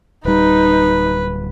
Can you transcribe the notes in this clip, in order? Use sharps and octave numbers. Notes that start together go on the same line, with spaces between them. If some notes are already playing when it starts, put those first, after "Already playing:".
D1 G3 D#4 B4